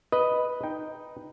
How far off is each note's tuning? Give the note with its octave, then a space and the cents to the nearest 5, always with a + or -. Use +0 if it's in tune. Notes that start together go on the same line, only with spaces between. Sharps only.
B4 +0 D#5 +0
D#4 +0 G5 +0